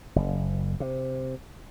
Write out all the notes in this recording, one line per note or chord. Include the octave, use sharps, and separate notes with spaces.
F#1
C3